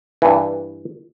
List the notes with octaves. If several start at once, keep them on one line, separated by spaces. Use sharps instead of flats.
G2 E3